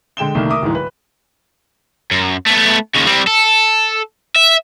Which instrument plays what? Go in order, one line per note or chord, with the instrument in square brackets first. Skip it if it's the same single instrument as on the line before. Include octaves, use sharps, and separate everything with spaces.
[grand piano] D3 G#3 G5 E7 G7
C2 D#3 A3 A#3
A#4 E5 D6 D#6
D1 G#2 E3
B4
[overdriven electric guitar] F#2
A3 B3
D#2 C#3
G3 C4
A4
E5